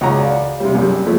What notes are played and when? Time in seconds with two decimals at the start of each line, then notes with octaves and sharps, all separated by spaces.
0.01 C#2 F#4 A#5
0.20 D5 F5
0.60 C3 G3
0.75 F#2 G3
1.05 F3 G#3 A3